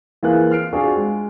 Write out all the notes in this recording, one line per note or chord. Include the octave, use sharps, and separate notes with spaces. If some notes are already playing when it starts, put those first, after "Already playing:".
E3 A#3 C4 F4 G#4 F#6
F6 C7 D7
C4 D4 F4 F#4 G#4
G#3